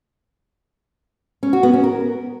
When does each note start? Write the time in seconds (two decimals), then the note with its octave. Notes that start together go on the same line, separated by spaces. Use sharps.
1.43 C#4
1.53 F#4
1.63 B3
1.73 C#4
1.84 A#4